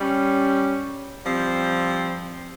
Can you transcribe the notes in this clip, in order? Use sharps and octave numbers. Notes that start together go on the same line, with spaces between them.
G3 C#4
F3 G3 C4